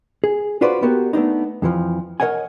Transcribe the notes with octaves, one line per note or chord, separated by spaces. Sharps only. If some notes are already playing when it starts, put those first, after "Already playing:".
G#4
D4 F4 F#4 B4 C5 D5
B3 F#4 G4 A#4
A3 B3 D4 D#4
F2 E3 F3
A#4 C#5 D#5 F#5 G#5